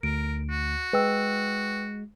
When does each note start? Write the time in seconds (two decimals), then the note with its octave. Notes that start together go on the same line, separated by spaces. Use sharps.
0.03 D2 A#4 D7
0.50 F#4
0.93 G#3 B4 G5 E6